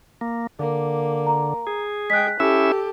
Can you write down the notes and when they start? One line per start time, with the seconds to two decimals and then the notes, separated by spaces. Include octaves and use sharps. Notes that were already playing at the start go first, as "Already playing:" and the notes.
0.21 A#3
0.59 D3 A#3
1.27 A#5
1.67 G#4
2.10 G#3 G5 F#6 B6
2.40 C#4 E4 G4 A4 E5 E6